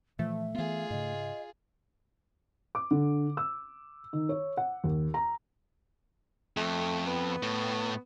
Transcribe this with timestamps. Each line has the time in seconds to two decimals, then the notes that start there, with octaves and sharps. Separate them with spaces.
0.19 A#2 E3 F3 A3 E5
0.54 E3 B3 F4 G#4
0.90 G#2 C#3 D#5
2.75 D6
2.91 D3
3.37 E6
4.13 D#3
4.29 C#5
4.57 F#5
4.84 D#2
5.14 A#5
6.57 F2 A3
7.07 B3
7.43 A2